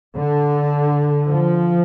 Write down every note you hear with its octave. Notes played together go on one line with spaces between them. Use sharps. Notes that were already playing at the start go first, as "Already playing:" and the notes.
D3
F3